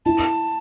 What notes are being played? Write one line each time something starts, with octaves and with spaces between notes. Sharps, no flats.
E4 A5